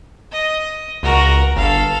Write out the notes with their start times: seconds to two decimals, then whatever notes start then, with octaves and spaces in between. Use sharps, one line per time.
0.32 D#5
1.03 C#2 F#4 A#4
1.56 G1 A4 F5